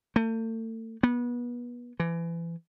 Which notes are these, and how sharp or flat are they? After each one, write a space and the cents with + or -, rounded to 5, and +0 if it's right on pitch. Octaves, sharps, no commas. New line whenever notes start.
A3 +40
B3 -30
E3 +30